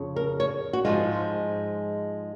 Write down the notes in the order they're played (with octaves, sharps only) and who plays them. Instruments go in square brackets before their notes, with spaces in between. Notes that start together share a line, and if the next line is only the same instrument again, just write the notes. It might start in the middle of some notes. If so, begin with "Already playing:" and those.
Already playing: [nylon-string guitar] F2 C#3
A#4
C#5
F#4
G#2 F3 G#3 F4